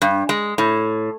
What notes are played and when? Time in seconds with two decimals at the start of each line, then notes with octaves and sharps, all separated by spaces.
0.02 G2
0.29 G#3
0.58 A2